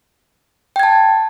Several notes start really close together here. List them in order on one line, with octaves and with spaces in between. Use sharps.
G5 G#6 A5